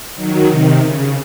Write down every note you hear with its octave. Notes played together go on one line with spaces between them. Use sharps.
D#3 F#3
C3 D#3
C#3